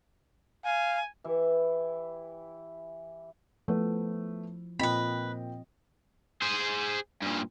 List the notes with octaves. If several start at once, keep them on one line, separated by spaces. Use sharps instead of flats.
F5 G#5
E3 E4 G4 E5
F3 A3 B3 E4
A#2 C4 F4 B4 D#5 G5 B5
G#4 C5
G2 A#2